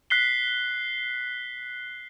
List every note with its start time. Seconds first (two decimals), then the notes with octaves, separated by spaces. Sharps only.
0.10 F#6 B6 C7 G7